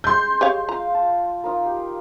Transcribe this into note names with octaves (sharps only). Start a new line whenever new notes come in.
G#3 C6 G6
G#3 G4 C#5 F5
F4 F5 A#5
A5
D#4 F4 A#4
G4